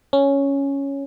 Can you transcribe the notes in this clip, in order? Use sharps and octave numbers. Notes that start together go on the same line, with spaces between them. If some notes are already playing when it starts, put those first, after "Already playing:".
C#4